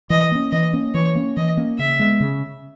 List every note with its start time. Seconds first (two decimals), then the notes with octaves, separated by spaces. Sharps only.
0.10 E3 D#5
0.32 A#3 C#4
0.52 E3 D#5
0.73 A#3 C#4
0.94 E3 C#5
1.15 A#3 C#4
1.37 E3 D#5
1.57 A#3 C#4
1.79 C#3 E5
1.99 G#3 B3
2.20 C#3